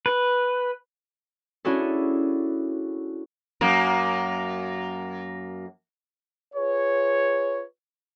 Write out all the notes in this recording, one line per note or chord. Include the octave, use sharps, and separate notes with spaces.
B4
C#4 D4 E4 F#4 G#4 A4
F#2 A#3
F4 G#4 B4 C#5